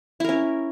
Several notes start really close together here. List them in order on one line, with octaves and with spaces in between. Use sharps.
E4 A#4 C#4